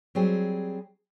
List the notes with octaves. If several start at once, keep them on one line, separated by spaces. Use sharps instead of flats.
F#3 G3 C4 G#4